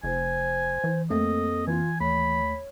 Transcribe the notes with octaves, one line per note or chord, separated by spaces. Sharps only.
F1 C5 G#5
E3
F2 A3 A#3 C4 A4 D#5
E3 F4 G#5
D#2 A3 C#5 B5